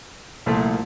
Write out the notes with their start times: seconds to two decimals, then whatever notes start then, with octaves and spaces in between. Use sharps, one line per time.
0.46 C2 A#2 F3 A3